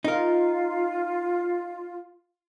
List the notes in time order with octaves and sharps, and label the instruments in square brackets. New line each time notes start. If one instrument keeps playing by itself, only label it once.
[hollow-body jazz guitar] D#4 A#4 [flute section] F4